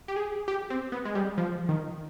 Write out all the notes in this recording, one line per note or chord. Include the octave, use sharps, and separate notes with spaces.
G4
G#4
G4
C4
B3
G#3
G3
F3
D#3